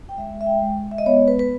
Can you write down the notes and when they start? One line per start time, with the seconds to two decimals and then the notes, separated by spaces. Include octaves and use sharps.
0.09 G5
0.18 G#3 E5
0.41 E5
0.46 G5
0.62 G#3
0.91 E5
0.98 D#5
1.06 B3 C#5
1.28 B4
1.39 B4